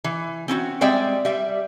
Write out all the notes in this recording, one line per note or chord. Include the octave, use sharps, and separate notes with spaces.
E3
C4 C#4 E4 F#4
G3 G#3 C4 D5 E5 G5
G3 E5